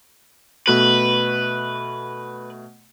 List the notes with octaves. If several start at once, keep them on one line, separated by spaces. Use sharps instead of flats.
B2 A3 F#4 B4